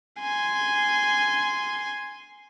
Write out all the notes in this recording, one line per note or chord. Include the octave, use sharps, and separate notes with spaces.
G#5 C6